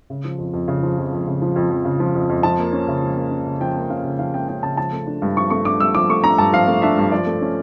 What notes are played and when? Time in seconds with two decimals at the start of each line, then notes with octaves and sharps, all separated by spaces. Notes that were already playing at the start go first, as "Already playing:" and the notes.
0.10 C#3
0.25 F3
0.39 F2
0.54 F2
0.68 C#3
0.83 F3
0.98 F2
1.13 F2
1.27 C#3
1.42 F3
1.56 F2
1.70 F2
1.85 C#3
2.00 F3
2.15 F2
2.30 F2
2.43 F3 A5
2.59 A#3
2.73 C#4
2.88 C#3
3.03 F3
3.16 A#3
3.31 C#4
3.47 C#3
3.60 F3 G5
3.76 A#3
3.90 C#4 F5
4.04 C#3
4.19 F3 F5
4.34 A#3 G5
4.48 C#4 G5
4.63 C#3 A5
4.77 F3 A5
4.93 A3
5.07 D4
5.22 G2
5.37 F3 C#6
5.50 A3 C#6
5.65 D4 D6
5.80 G2 E6
5.94 F3 D6
6.09 A3 C#6
6.24 D4 A#5
6.38 G2 A5
6.53 F3 F5
6.67 A3
6.82 D4 E5
6.98 G2
7.12 F3 D5
7.26 A3
7.42 C#4